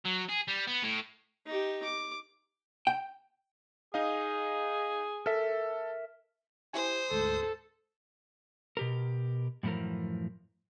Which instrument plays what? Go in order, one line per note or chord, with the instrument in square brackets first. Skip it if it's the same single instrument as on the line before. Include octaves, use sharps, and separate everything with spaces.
[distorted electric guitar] F#3
G#4
G3
B3
A2
[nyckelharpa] D#4 G4
D6
[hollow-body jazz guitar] G5
[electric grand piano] D#4 D#5 F5 [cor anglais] G#4
[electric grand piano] A4 [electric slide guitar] A#4 E5
[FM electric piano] E4 G4 G#5 [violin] C5 D#6
[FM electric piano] D2 G#2 [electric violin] A4
[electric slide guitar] B2 G4 A#4
F#2 A2 E3 F3 A#4